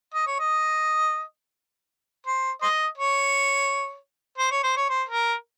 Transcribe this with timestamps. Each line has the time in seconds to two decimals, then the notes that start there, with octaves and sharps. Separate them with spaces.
0.14 D#5
0.27 C#5
0.39 D#5
2.26 C5
2.62 C5 D#5
2.97 C#5
4.38 C5
4.51 C#5
4.63 C5
4.77 C#5
4.89 C5
5.08 A#4